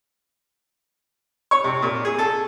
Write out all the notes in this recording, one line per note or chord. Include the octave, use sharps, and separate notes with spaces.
C#5
C3
A#2
G#4
A4